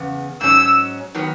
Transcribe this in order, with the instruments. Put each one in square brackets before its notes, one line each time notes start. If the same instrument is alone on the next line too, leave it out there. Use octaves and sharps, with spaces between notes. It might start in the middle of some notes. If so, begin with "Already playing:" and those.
Already playing: [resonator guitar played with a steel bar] E2 C#3 B3
[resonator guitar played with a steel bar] G#2 F#3 C#4 [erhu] E6
[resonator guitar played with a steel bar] D#3 F#3 B3